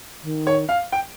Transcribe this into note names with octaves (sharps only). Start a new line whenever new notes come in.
D#3
C#5
F5
G5